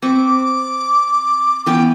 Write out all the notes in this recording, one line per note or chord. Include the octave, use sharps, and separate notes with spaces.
C4 B4 C#6 D6
E3 B3 C#4 G5